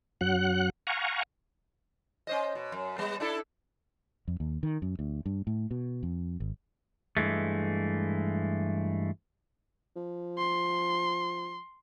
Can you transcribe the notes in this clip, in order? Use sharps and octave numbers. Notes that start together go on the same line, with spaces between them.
F#2 F#3 F#5 F#6
F5 F#5 G#5 A#5 C#6
C#4 C5 D#5
B2
F#2
G3 B3
D4 E4 A4
F2
D#2
D#3
F#2
D2
G2
A2
B2
F2
G#1
G2 E3 G#3 A3
F3
C6